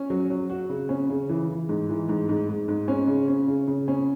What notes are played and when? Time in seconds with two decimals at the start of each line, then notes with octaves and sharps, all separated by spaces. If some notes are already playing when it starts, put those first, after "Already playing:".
Already playing: C#4
0.10 F#3
0.30 F#3
0.50 F#4
0.70 C#3
0.89 C#4
1.10 C#3
1.29 E3
1.49 E3
1.69 G#2
1.89 E3
2.09 G#2
2.29 G#2
2.49 G#2
2.68 G#2
2.88 C#4
3.08 C#3
3.28 C#4
3.48 C#3
3.68 C#3
3.88 C#4